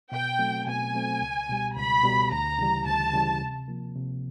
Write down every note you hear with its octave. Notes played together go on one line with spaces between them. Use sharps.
B2 G5
F#3 A3 C4
B2 G#5
F#3 A3 C4
C#2
B2 G3
C#2 B5
B2 G3
D2 A#5
C#3 E3 G3
D2 A5
C#3 E3 G3
C3
F3 A#3
C3